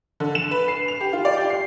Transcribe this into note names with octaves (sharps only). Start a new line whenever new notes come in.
D3
E7
B4
C7
F7
G4
F4
D5
G4
C7